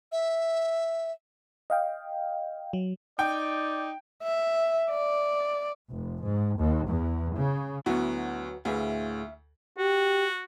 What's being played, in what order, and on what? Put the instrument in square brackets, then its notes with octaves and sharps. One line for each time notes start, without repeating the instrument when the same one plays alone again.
[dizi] E5
[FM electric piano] D#5 F5 G5
F#3
[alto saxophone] D#4 [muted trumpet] D5 [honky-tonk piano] G5
[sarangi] E5
D5
[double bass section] F1
G#2
D#2
E2
C#3
[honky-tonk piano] D2 F#4 [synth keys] F#3 B3 [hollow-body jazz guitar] E4
[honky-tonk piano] D2 [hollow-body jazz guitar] A2 G#4 B4 [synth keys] E5 F5
[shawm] F#4 [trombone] G4